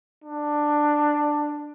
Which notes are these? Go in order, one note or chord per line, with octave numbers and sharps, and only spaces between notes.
D4